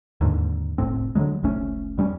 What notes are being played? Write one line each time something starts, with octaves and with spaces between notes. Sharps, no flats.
D#2 G#2 D3
F1 C2 A2 C4
D3 E3 F#3 G#3
F1 C2 A3 C#4
F2 G3 B3 C#4